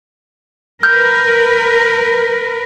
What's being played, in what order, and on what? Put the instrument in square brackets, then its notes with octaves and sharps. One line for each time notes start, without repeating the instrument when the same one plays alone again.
[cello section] A#4 B4 [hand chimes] F6 G6